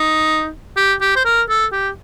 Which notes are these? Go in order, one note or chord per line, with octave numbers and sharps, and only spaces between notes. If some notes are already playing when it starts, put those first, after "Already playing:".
Already playing: D#4
G4
G4
C5
A#4
A4
G4